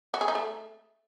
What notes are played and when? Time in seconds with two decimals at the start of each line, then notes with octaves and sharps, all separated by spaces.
0.14 F#4
0.21 G#4
0.28 D#4
0.35 A3